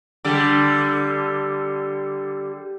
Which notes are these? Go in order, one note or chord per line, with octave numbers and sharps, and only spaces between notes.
D3 G3